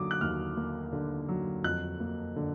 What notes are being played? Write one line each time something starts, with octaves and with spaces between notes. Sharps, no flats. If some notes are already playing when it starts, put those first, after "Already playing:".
Already playing: D#2 D3 F#3 D6 D#6
F#6
D#2 F6
A#3
D3
F#3
F2 F#6
A#3
D3